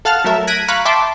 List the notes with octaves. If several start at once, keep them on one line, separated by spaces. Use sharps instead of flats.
A4 F5 F#5 A5 F6
F#3 A3 A#4 E5
F#6 G#6 A#6 B6 D7 D#7
F5 A#5 B5 C#6 F#6
E5 G5 A5 B5 C6 D6